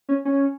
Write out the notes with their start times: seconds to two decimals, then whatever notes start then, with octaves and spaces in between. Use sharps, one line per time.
0.09 C#4
0.25 C#4